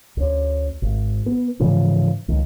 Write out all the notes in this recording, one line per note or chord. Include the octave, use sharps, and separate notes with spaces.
D2 C#4
G#1
B3
G#2 C#3 E3 F3
C#2 D#3